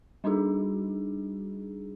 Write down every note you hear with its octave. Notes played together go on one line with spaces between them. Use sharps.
G3 D4 D#4 F#4 G#4